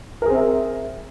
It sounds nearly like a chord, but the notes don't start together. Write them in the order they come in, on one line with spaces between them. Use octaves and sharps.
A#4 G#4 C4 E5